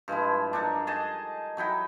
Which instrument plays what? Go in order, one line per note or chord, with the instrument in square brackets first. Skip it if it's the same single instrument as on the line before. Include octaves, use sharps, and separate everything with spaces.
[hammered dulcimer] G2 F3 G#3 E4
D4 D#4 A4 A#4
G#4 D#5 A5
F#3 D#4 E4 G5